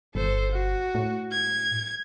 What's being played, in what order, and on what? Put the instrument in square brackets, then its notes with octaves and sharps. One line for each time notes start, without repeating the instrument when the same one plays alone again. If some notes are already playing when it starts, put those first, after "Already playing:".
[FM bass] G1 [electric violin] A4 C5
[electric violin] F#4
[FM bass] A2
[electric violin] G#6